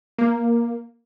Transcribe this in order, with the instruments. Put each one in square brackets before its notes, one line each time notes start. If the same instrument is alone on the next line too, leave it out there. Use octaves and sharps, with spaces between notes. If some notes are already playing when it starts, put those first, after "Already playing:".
[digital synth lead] A#3